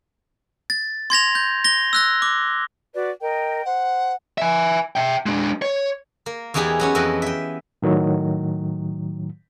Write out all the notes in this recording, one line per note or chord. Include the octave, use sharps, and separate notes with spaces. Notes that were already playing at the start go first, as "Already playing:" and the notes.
A6
C6 G#6 A#6 F7
G6
A#6 G7
E6 F#6 A#6
D6
F#4 B4 D5
A#4 D#5 G5
C5 F#5
E5 G#5
E5 G5
G#3 D4
C#5
A#3
E2 E3 D#4 G4 G#4 B5
F#3 B3 C#4
F2 E3 D#5
E5 G5
A2 D#3 F#3